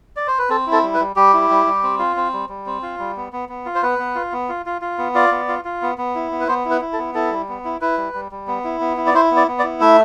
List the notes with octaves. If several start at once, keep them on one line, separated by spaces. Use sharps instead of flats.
D5
C5
B4
C4 A4
E4
A4
G3
B4
G3
G3 G4
E4
G3
G3
C4
F4
C4
G3
G3
C4
F4
G3
B3
B3
B3
F4
C5
B3 B4
B3
F4
B3
F4
F4
F4
B3
F4 D5
B3
F4
F4
B3
B3
E4
B3
B4
B3 C5
E4
B4
E4
A4
B3
E4 A4
G3
B3
E4
E4 B4
G3
G3
G3
B3
E4
B3
E4
D5
E4 C5
B3
D5
B3
D5
E4
A3 E5